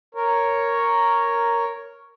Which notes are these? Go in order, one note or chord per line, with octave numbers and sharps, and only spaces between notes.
A#4 C#5